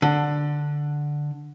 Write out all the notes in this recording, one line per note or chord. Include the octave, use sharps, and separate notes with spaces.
D3